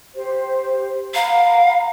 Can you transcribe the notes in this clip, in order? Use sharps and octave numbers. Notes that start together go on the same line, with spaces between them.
G4 C5
F5 F#5 A#5 B5